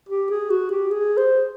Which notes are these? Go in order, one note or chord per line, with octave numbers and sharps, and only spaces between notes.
G4
G#4
F#4
G4
G#4
C5